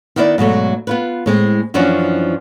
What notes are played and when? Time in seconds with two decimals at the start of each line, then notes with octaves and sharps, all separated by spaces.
0.16 D#3 B3 D#4 E4 B4 D5
0.38 G#2 B2 F#3 A3
0.87 B3 F4 B4
1.26 A2 G#3 C4
1.74 F#2 E3 F3 C#4 D4 F#4